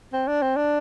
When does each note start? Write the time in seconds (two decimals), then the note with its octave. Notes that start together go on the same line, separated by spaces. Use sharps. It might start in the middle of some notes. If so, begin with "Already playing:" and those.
0.13 C4
0.27 D4
0.42 C4
0.56 D4